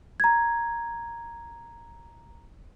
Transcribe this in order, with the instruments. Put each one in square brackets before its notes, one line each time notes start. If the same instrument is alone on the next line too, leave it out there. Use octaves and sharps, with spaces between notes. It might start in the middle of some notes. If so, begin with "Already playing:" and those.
[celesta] A#5 G#6